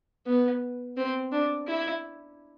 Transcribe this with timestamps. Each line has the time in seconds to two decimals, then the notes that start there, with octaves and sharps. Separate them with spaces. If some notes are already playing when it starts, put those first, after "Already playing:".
0.26 B3
0.97 C4
1.32 D4
1.67 E4